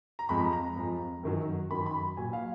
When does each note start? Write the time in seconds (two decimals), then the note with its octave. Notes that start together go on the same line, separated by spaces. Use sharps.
0.19 A#5
0.29 F2 F3 G#3 B5
0.53 A#5
0.76 F2 F3 G#3
1.23 F#2 D#3 F#3
1.71 F#2 D#3 F#3 B5
1.86 B5
2.17 A#2 F#3 G#5
2.33 F5